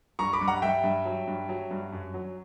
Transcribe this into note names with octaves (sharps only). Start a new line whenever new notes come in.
G2 A#5 C#6
B5 D6
G2
F#5 A#5
G2 E5 G5
G2
F#3
G2
F#3
G2
F#2
F#3